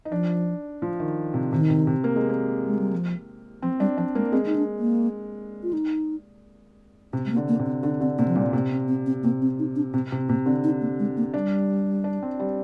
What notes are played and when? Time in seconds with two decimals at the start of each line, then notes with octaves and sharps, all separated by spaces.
0.05 D#4
0.11 F3 D4
0.82 F3
0.99 D#3
1.34 C3
1.52 C3 D#3
1.70 C3
1.87 C3
2.04 A#3
2.16 G#3
2.29 A#3
2.66 G#3
2.79 G3
2.93 F3
3.62 F3 C4
3.80 G3 D4
3.97 F3 D4
4.15 G#3 A#3
4.32 G#3 C4
4.46 D#4
4.56 D4
4.79 A#3
5.63 F4
5.73 D#4
7.13 C3 C4
7.26 G#3
7.31 A#3
7.37 D3
7.49 A#3
7.59 C3
7.65 C4
7.83 D3 D4
8.01 D3 C4
8.18 C3 A#3
8.28 F3
8.36 A#2 G3
8.53 C3 A#3
8.71 C4
8.88 C4
9.06 C4
9.23 C3 A#3
9.42 C4
9.59 D#4
9.76 D4
9.94 C3 C4
10.12 C3 C4
10.29 C3 A#3
10.46 D3 C4
10.64 D#4
10.81 A#3
10.99 G#3
11.17 A#3
11.34 G3 D4
12.04 D4
12.22 C4
12.39 G3